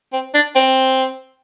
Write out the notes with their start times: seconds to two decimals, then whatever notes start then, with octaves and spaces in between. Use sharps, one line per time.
0.13 C4
0.34 D4
0.55 C4